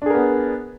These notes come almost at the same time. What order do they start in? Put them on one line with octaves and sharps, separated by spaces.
D4 G#4 A#4 B3